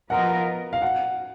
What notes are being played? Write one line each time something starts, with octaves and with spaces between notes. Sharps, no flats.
F3 B3 F4 A#4 D#5 F#5
F5
F#5